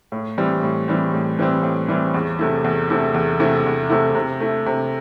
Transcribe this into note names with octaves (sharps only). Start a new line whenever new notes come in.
A2
E3 G3 C4
A2
E3 G3 C4
A2
E3 G3 C4
A2
E3 G3 C4
E2
C3 A3 E4
E2
C3 A3 E4
E2
C3 A3 E4
E2
C3 A3 E4
C3
A3 E4
C3